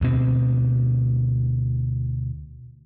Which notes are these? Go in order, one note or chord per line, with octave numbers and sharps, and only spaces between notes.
D2 B2 C4